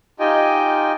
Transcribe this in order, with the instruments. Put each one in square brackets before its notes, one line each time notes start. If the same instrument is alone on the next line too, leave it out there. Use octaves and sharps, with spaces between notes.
[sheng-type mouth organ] D#4 F4 G4 D#5 G5 G#5